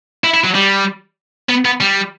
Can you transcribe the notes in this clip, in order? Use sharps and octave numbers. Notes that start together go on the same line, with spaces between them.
E4
E4
F#3
G3
B3
B3
G3